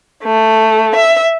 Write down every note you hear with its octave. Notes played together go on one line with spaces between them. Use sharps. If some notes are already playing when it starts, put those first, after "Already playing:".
A3
E5